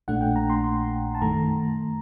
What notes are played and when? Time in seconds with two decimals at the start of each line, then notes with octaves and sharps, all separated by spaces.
0.08 A#1 A#2 A3 D4 F#5
0.21 G5
0.36 A#5
0.50 C6
0.64 C6
1.15 A5
1.21 F#2 D#3 A3 A#5